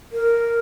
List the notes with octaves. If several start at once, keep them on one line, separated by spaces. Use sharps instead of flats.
A#4